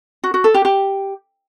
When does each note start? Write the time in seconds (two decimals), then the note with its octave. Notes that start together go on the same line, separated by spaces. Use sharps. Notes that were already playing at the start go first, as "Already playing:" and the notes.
0.24 F#4
0.34 F#4
0.44 A4
0.54 G4
0.65 G4